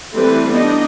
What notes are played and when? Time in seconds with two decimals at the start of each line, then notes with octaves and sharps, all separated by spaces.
0.13 E3 G3 A3 C4 A4 B4
0.51 B3 D4 D#4 D#5